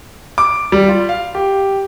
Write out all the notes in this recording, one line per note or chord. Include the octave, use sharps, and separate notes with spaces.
D6
G3
F4
F5
G4